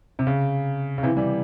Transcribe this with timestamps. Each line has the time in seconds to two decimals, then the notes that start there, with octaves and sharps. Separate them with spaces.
0.19 C3
0.27 C#3
0.98 C#3
1.03 C3 E3
1.17 E3 G3